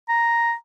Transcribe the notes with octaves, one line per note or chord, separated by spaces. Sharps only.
A#5